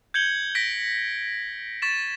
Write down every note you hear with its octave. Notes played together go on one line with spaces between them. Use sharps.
G6 G#6 C#7 F#7 G7
G6 A#6 B6 D7
C#6 A6 B6 E7